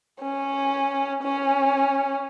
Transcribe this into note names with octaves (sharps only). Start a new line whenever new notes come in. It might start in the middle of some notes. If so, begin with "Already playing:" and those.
C#4
C#4